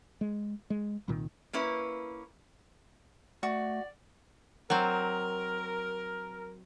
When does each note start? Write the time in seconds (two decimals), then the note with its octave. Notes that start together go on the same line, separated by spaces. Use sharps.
0.21 G#3
0.70 G#3
1.08 C2 A#2 D#3
1.53 A#3 C#4 E4 B4
3.43 A3 F#4 D5
4.70 F#3 C4 A#4